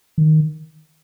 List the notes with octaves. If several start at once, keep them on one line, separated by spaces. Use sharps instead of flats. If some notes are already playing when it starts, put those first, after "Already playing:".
D#3